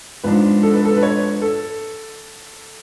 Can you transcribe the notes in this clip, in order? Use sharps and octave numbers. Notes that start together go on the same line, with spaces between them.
G#2 F3 B3 D4 B4
A4
B4
A4
B4
C#5
A4